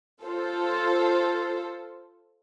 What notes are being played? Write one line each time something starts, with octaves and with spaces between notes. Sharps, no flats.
F4 A4 C5